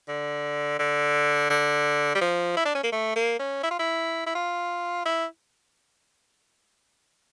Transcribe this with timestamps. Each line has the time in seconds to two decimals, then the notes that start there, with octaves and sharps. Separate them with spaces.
0.08 D3
0.79 D3
1.50 D3
2.15 G3
2.21 F3
2.57 E4
2.65 D4
2.75 C#4
2.83 A#3
2.92 A3
3.16 A#3
3.39 C#4
3.63 E4
3.71 F4
3.79 E4
4.26 E4
4.35 F4
5.05 E4